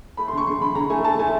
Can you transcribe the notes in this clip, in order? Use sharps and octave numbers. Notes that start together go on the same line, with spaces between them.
A3 B5
C6
D3 C#6
D3 C6
D3 B5
D3 A#5
A3 G#5
A3 A5
A3 G#5